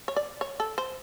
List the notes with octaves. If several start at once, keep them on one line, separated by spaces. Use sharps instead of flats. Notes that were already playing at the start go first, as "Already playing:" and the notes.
C#5
D5
C#5
A4
C5